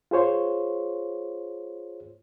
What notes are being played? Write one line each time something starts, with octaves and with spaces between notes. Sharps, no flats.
F4 G#4 C5 C#5